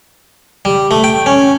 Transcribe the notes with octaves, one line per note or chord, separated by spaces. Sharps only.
G3
A3
G5
C#4